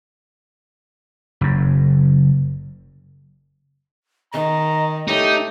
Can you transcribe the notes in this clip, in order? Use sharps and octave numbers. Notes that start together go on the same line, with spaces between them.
F#1 F#2
D#3 D#5 A#5
A3 D#4 G4 C#5